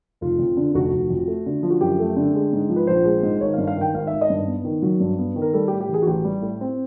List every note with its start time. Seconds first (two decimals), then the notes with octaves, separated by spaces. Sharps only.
0.21 F1 F4
0.39 F2
0.57 D3
0.74 F1 F#4
0.93 F1
1.10 F2
1.28 A3
1.46 D3
1.63 F3
1.70 F#4
1.81 F#2 G4
1.99 A3
2.17 D3
2.34 G#3
2.53 G#2
2.69 F3
2.76 B4
2.87 A#1 C5
3.05 G#3
3.23 G#2
3.41 G#1 C#5
3.54 G2 F5
3.67 F5
3.77 D#3 G5
3.94 G#1 F5
4.07 E5
4.13 G#1
4.21 D#5
4.30 G2
4.47 B3
4.65 D#3
4.82 F#3
5.00 G2
5.18 B3
5.36 D#3
5.42 A#4
5.53 G3 A4
5.68 G4
5.72 A2
5.81 G4
5.89 E3
5.94 G#4
6.02 F#4
6.07 A1 G4
6.24 G3
6.42 A2
6.61 C4